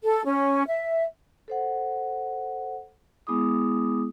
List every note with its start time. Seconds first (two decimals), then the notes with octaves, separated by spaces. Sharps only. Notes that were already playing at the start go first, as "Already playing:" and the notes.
0.04 A4
0.25 C#4
0.68 E5
1.48 A4 C5 F#5
3.27 G#3 B3 E4 G#4 D6 D#6